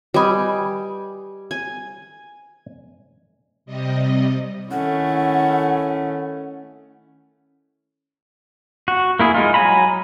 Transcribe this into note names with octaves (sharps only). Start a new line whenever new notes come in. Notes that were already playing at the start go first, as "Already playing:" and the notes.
G3 B4 D#5 G#5
G#5
C3 G3 D#5
D#3 A3 C#4 E4 F#5
F#4
A#3 E4 G#4
G#3 D#4 F4
F#3 G#5 A#5 B5